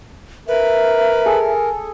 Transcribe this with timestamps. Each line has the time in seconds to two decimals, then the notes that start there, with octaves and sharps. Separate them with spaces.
0.48 A#4 B4 E5
1.26 G#4 A4